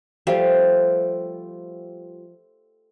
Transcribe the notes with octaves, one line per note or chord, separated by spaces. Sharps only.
F3 G3 A3 F4